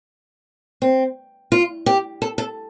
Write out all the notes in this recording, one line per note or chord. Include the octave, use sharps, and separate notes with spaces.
C4
F4
G4
A4
A4